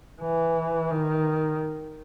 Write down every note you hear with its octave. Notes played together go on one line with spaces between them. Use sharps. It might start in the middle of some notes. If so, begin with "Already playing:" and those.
E3
D#3